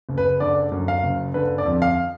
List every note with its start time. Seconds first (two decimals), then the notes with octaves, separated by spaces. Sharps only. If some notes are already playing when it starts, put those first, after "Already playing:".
0.09 F#1
0.18 B4
0.40 D3 D5
0.72 F#2
0.88 F5
1.03 F#1
1.34 D3 B4
1.58 D5
1.66 F2
1.82 F5